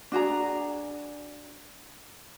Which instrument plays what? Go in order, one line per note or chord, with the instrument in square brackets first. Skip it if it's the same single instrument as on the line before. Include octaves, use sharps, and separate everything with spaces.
[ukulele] D4 F#4 G#4 A#5